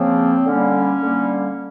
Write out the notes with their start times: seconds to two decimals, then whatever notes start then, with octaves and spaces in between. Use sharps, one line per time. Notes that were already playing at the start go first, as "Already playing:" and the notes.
Already playing: C#3 F3 A#3 C4
0.46 D3 G3 A#3 C#4
1.03 D3 G3 A#3